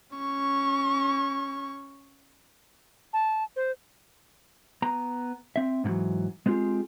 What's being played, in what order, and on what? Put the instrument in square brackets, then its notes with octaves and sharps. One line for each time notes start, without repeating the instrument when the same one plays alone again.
[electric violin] C#4 C#6
[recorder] A5
C5
[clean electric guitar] B3 A#5
C4 E5
G#2 B2 D3 E3 F#3
G#3 B3 C4 F4 G4 G#4